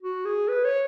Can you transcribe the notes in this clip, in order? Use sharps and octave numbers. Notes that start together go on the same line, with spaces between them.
F#4
G#4
B4
C#5